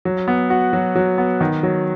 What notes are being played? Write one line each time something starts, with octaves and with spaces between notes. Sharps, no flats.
F#3
B3
F#4
F#3
F#3
B3
D#3
F#3